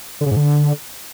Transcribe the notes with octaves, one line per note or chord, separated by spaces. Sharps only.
D3
C#3
G#2
D3